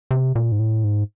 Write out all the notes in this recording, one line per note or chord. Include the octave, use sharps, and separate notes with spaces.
C3
A#2
G#2
A2
G#2